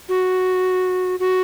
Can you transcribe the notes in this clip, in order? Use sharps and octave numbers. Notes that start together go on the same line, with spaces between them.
F#4
F#4